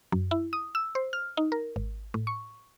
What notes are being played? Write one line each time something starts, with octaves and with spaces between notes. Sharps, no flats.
F#2
E4
D#6
E6
C5
F6
D#4
A#4
G#1
A2
C#6